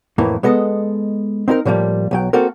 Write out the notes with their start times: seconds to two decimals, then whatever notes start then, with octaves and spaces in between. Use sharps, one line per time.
0.18 F2 A2 E3 A#3
0.43 G#3 B3 A4 D#5
1.48 C4 D#4 G4 A#4
1.65 A2 D3 F3 G3 A#3
2.11 B1 F#3 G5
2.33 A#3 C4 F#4 A4 A#4